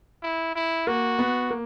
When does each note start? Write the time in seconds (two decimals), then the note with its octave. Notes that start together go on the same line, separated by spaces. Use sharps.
0.23 E4
0.56 E4
0.87 A#3 F#4
1.19 B3
1.50 A#3